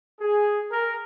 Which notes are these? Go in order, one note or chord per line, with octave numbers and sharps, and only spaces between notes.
G#4
A#4